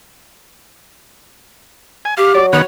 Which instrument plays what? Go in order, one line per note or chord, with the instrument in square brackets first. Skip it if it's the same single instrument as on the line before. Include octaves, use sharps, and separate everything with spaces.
[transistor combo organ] G#5
[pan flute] G4 [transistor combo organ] F5
[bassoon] F#3 [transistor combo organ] D5
[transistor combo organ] D#3 B3 F#5 [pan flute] C#5